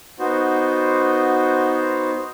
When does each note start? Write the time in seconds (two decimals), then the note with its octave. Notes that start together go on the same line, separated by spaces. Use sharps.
0.19 B3 D#4 F#4 C5